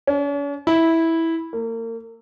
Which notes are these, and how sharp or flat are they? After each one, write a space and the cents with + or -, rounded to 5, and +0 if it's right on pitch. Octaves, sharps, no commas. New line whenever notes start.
C#4 +45
E4 -10
A#3 -35